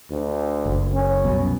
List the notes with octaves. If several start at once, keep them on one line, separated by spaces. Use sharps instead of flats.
D2
F#1
C#4
C2 F#2 B2